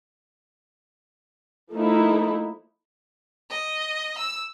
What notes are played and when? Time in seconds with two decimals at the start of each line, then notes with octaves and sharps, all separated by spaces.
1.73 F3 A3 A#3 D#4 E4
3.50 D#5
4.18 E6